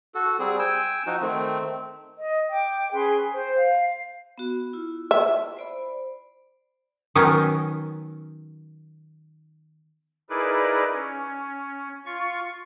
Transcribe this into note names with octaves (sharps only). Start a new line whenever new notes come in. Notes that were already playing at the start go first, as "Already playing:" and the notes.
F#4 A4
G3 C4 G#4
G5 G#5 E6
F3 D#4 F#4
D#3 A3 C4
D#5
G5 D6
C#4 G#4 B4 C6
C5 G5
F5
B3 F#4
E4 F4
E5
C5 D5 B5
D#3 F#3 B3 C#4 D#4 A#4
D#4 E4 G#4 A#4 B4 D5
C#4
F4 C#6